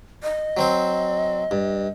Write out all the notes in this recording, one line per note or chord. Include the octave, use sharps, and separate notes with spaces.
D#5
F#3 C4 C5
G2